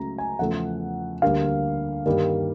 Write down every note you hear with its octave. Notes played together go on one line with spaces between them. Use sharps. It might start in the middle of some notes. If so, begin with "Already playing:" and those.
Already playing: C#2 C#3 F#3 A3 A#5
G#5
E2 C#3 F3 A3 F#5
D2 D3 G3 A#3 F5
G2 D#3 G3 A#3